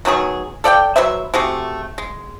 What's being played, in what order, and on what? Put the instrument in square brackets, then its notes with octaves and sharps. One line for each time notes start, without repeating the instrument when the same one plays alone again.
[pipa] B2 D#3 F#3 G#4
A4 D5 F#5 G5
F#3 B4 C5 E5
C3 A3 F#4 G#4
G#3